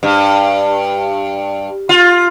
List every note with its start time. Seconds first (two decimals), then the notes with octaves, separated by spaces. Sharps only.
0.03 G2
1.89 F4